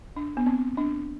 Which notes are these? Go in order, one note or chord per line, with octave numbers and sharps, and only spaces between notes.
D4
B3
C4
D4